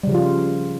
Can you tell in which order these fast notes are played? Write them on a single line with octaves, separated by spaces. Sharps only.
G3 C#3 F3 F4